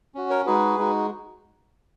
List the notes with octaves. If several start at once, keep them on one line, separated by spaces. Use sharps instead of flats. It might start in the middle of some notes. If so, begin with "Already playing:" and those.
C#4 F#4
A#4 C#5
G#3 D#4 F#4 G#4 B4
G#3 D#4 F#4